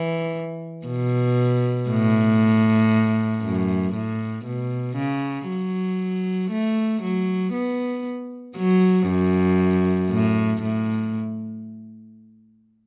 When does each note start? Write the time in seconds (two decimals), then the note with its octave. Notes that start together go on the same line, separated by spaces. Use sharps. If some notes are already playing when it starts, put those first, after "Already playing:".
Already playing: E3
0.87 B2
1.89 A2
3.43 F#2
3.94 A2
4.45 B2
4.97 C#3
5.48 F#3
6.51 A3
7.03 F#3
7.53 B3
8.57 F#3
9.08 F#2
10.10 A2
10.62 A2